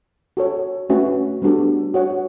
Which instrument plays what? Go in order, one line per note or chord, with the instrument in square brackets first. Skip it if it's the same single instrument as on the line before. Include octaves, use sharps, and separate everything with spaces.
[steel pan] F#4 A4 C#5
A3 C#4 F#4 B4 E5
G3 B3 D4 F#4 A4
F#4 C#5 F#5